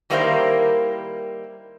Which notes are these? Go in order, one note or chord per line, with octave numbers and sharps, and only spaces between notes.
D#3 G3 A#3 E4 A#4 C5